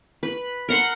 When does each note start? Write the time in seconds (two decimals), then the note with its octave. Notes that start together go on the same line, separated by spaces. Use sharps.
0.23 B4
0.69 A#4 F#5 C6